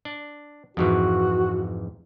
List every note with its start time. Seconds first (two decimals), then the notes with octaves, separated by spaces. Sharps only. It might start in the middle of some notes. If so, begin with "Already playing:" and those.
0.05 D4
0.77 F2 G#2 E3 F#4